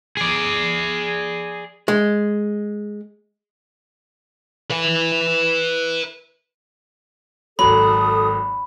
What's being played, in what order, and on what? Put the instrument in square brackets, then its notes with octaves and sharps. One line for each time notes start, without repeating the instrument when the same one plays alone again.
[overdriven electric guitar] G#4 D5
[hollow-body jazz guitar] G#3
[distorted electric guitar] B4 E5
[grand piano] G#1 F#3 [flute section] A4 D#6 [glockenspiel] B5